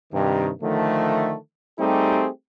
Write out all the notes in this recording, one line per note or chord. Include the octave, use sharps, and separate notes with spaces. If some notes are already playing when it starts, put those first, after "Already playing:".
G2 C3 D#3
D3 D#3 F3 A3
G3 A3 C4 D#4 G4 G#4